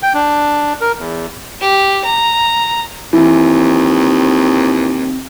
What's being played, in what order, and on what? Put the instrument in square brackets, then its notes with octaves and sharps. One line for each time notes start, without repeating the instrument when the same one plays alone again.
[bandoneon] G5
D4
A#4
E2
[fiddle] G4
A#5
[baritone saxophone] D#2 [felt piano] E3 [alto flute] C4